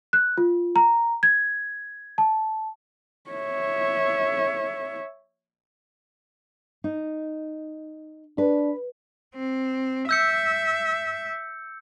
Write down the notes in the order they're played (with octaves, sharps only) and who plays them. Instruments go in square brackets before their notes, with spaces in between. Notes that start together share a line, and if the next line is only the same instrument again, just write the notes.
[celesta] F#6
F4
A#5
G#6
A5
[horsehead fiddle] C#5 E5
[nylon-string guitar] D#4
[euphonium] D4 [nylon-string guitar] B4
[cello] C4
[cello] E5 [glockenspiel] E6 G6 C#7